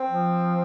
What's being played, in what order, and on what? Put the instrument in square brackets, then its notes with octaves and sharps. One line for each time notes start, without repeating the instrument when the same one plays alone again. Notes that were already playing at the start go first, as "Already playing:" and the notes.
Already playing: [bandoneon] C4
[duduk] F3